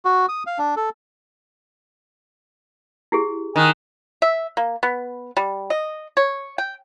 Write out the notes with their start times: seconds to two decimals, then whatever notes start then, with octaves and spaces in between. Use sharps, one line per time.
0.05 F#4
0.29 D#6
0.46 F5
0.59 D4
0.77 A4
3.12 E4 G4 G#4
3.56 D#3 G#5 D#6 F#6
4.22 E5
4.57 A#3
4.83 B3
5.37 G3
5.70 D#5
6.17 C#5
6.58 G5